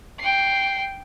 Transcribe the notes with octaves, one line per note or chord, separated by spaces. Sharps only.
G5 C7